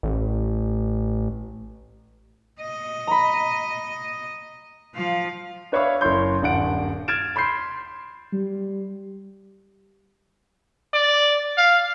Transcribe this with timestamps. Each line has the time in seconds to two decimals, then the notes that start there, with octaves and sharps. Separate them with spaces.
0.03 A1
2.60 D#5
3.07 A#5 B5
4.95 F3 F5
5.72 D4 B4 C#5 E5 F5 C#6
6.01 F#1 E4 C#5 C6 G6
6.42 D#1 G2 F#5 D7
7.08 F6 G#6 A6 D7 E7
7.36 B5 C6 G6 C7
8.33 G3
10.94 D5
11.57 F5